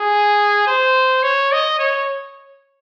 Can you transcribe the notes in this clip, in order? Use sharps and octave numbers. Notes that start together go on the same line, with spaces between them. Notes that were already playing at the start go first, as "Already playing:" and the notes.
Already playing: G#4
C5
C#5
D#5
C#5